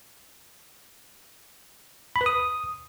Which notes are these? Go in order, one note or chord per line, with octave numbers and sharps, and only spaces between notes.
B5
B4
D#6